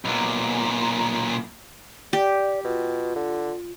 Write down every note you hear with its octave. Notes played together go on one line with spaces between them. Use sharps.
B1 A#2
G4 D5
B2 F4
D3